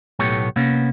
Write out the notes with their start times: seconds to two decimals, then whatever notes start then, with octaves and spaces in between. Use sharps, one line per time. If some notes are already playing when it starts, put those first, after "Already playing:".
0.19 B1 A2 A3 B3 G4 C#5
0.56 C3 A#3 B3 C#4